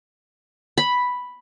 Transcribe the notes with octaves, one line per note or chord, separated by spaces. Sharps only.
B5